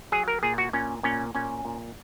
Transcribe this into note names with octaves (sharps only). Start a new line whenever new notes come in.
F#3 G#4
A#4
A#2 G#4
F#4
A#2 C#4
A#2 C#4
A#2 C#4
A#2